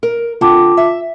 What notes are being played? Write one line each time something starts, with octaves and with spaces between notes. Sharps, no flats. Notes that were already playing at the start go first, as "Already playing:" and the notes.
A#4
D3 C4 F4 F#5 A5 D6
E5